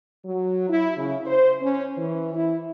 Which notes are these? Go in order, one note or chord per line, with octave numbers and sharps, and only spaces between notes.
F#3
E4
C#3
C5
C#4
E3
E4